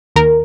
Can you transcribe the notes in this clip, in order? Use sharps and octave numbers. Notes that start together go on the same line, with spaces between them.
D#2 A#4